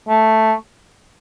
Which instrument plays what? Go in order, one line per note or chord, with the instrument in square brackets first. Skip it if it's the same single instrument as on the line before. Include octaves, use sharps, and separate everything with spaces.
[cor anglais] A3